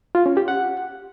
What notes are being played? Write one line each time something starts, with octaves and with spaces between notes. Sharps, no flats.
F4
C#4
G4
F#5